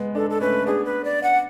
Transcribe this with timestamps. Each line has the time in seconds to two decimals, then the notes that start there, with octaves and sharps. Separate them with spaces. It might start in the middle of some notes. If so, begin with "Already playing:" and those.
Already playing: G#3 B3
0.15 B3 D4 A4
0.30 A4
0.41 A3 C#4 B4
0.66 B3 D4 G#4
0.85 B4
1.04 D5
1.23 F#5